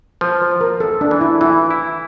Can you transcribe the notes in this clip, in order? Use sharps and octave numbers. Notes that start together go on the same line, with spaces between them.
F3 C5
C5
F4
A#4
E2 A4
D4
E3
E4
E3 E4
E4